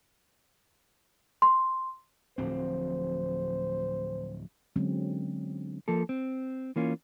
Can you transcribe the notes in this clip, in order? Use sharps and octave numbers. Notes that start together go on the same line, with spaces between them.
C6
D1 A2 F3 C4 F#4 C5
D3 F#3 G#3 C4 C#4
F3 A#3 A4
C4
E3 A#3 C#4 F4